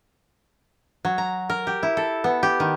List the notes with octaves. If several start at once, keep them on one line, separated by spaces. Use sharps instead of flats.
F#3
A#5
A#4
G4
E4
A4
B3
G4
D#3